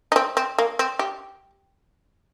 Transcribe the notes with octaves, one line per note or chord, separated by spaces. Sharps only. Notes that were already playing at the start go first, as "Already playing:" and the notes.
D#4
C4
C4
A#3
C4
G4